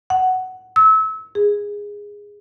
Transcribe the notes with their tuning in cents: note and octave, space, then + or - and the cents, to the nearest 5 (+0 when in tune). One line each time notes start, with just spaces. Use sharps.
F#5 +10
E6 -30
G#4 -15